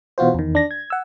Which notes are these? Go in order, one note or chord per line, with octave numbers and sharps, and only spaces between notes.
B2 E3 F4 F#4 C5
E2 D#3
D4 A#6
G#6
F#5 E6